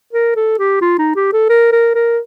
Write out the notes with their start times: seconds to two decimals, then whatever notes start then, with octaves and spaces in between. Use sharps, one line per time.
0.13 A#4
0.36 A4
0.59 G4
0.81 F4
0.98 D#4
1.16 G4
1.33 A4
1.49 A#4
1.72 A#4
1.95 A#4